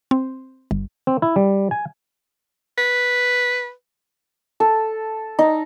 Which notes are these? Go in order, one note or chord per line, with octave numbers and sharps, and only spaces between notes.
C4
G1
C4
E4
G3
G#5
B4
A4
D#4